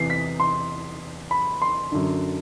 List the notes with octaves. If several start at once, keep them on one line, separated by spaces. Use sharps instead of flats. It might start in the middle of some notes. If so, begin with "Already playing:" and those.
Already playing: E2 C3 E3 C7
B6
C6
B5
C6
F#2 D3